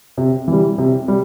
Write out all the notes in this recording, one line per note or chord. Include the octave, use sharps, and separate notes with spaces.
C3
E3 G3
C3
G3